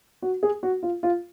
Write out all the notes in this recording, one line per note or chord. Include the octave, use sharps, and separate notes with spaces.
F#4
G#4
F#4
F4
F4